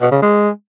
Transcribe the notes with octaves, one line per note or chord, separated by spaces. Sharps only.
B2
C#3
G#3